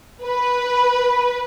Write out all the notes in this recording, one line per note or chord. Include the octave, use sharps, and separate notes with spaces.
B4